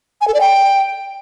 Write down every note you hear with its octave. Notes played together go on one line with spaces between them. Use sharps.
G#5
A4
D5
G5